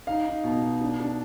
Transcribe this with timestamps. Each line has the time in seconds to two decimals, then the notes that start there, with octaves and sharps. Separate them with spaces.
0.07 D#4 F5
0.26 D#4
0.44 B2
0.62 D#4
0.81 D4
1.00 D4